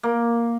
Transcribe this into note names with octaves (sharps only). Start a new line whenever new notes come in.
A#3